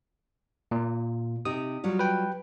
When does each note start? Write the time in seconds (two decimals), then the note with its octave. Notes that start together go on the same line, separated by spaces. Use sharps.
0.71 A#2
1.45 C3 D#4 G4 D#6
1.84 F#3 G3 F4
1.99 B4 G5